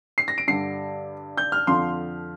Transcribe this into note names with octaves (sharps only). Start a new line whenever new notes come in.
C7
A#6
D7
G2 D3 G3 C7
G6
F6
F2 D3 F3 C6